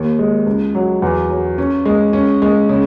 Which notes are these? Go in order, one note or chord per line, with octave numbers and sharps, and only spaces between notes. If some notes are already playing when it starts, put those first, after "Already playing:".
Already playing: D#2
G#3
C#2
F#3
E2
F#3
C#4
G#3
C#4
G#3
C#3